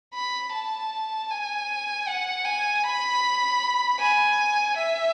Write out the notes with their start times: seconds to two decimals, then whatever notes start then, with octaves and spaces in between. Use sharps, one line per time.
0.14 B5
0.53 A5
1.30 G#5
2.08 F#5
2.45 G#5
2.84 B5
3.99 G#5
4.77 E5